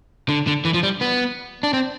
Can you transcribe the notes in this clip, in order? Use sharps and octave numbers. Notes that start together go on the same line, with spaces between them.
D3
D3
E3
F3
G3
B3
D4
C4